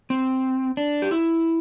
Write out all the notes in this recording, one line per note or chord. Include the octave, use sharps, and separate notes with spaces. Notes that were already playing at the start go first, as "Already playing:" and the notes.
C4
D4
G4
E4